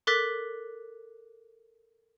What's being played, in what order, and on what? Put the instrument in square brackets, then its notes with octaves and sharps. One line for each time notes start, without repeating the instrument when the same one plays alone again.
[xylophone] A4 A#4 D6 F#6 A6 B6